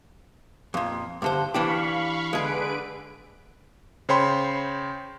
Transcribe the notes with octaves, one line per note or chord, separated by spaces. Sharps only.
F2 A#2
G2 D3 C5
E3 D4 G4 F5 B5 C#6
D3 G#3 G#4 B4 D7
C#3 C5 C#5 G5 B5 C6